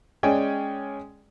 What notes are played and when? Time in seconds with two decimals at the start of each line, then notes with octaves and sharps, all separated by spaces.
0.23 G#3 C#4 D5 G5 G#5